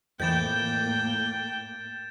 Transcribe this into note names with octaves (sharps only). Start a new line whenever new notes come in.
F2 A2 E3 A#3 G5 G6 A6 E7